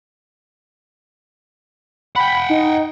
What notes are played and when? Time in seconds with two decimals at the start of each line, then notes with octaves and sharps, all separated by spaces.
2.16 F#5 G5 B5
2.50 D#4